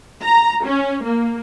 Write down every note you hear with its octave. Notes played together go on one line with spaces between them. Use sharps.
A#5
C#4
A#3